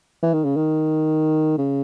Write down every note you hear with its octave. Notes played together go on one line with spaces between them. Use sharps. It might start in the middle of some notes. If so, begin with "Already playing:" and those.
E3
D#3
C#3
D#3
C#3